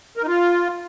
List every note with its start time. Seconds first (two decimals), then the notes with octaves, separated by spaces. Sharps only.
0.17 A#4
0.22 D#4
0.28 F4